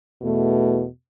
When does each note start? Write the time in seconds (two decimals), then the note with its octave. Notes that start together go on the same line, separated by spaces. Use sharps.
0.22 E2 B2 A3